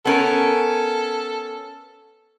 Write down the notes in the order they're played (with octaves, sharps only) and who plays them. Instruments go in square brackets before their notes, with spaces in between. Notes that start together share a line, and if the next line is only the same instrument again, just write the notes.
[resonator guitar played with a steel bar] B3 C#4 A#4 [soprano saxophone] A4